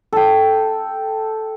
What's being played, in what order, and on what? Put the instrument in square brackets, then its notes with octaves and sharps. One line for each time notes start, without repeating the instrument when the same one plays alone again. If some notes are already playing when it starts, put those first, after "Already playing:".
[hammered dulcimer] A4 G5